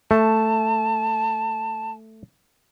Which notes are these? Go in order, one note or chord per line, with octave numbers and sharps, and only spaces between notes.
A3 A5